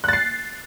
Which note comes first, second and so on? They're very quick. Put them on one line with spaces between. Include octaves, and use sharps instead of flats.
F#6 A6 C7